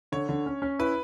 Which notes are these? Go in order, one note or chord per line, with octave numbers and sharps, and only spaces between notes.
D3 C#5
D3
C#4
C#4
E4 B4